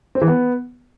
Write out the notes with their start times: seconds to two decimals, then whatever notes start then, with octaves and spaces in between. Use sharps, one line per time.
0.15 C4
0.22 E3
0.28 B3